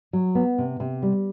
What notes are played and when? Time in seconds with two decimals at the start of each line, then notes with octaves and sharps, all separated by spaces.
0.13 F#3
0.35 B3
0.58 C3
0.80 C3
1.02 G3